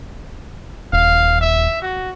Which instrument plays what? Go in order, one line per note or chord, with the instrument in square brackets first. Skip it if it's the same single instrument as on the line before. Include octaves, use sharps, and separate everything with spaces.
[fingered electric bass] D#1 [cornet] F5
[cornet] E5
F#4